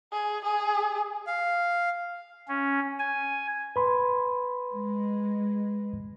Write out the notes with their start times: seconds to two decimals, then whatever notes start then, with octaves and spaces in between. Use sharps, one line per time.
0.12 G#4
0.45 G#4
1.27 F5
2.48 C#4
2.99 G#5
3.76 B4 B5 C6
4.72 G#3